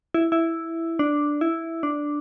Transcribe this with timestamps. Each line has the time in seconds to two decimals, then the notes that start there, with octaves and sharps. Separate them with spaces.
0.14 E4
0.32 E4
0.99 D4
1.41 E4
1.83 D4